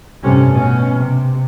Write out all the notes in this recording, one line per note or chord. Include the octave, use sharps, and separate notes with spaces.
A1 G2 C3 A3 C#4
B2 C#4
C3